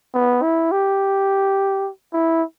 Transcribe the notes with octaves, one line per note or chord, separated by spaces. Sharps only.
B3
E4
G4
E4